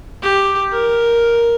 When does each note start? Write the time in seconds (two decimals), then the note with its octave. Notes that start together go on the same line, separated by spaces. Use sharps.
0.22 G4
0.72 A#4